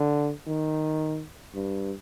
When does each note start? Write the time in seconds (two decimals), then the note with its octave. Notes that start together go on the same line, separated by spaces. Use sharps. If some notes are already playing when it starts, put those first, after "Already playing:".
Already playing: D3
0.47 D#3
1.55 G2